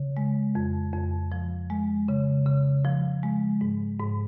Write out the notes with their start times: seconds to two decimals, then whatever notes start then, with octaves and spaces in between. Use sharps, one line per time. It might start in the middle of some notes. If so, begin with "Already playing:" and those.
Already playing: C#3
0.17 G#3
0.55 F2
0.93 F2
1.32 F3
1.70 G#3
2.08 C#3
2.46 C#3
2.85 F3
3.23 G#3
3.61 G#2
4.00 G#2